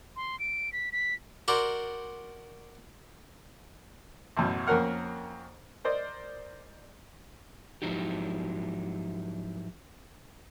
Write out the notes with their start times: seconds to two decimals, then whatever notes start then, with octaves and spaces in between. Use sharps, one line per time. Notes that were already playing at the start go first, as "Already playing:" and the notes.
0.16 C6
0.40 D7
0.73 B6
0.92 B6
1.48 F#4 A#4 C5 D5
4.37 A1 F#2 B2
4.67 F2 A#3 C#4 A#4 F#5 F6
5.84 A#4 C5 D5 D#5
7.82 G#2 F3 F#3 D#4 E4 G4